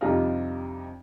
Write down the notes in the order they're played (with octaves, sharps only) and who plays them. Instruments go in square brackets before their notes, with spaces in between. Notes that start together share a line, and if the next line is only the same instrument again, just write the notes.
[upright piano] F2 C3 G3 D4 D#4 F4